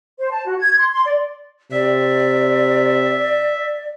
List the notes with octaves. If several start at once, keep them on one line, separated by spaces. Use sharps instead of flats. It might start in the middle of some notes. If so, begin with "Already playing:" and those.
C5
A5
F#4
G#6
C6
C6
D5
C3 D5 E5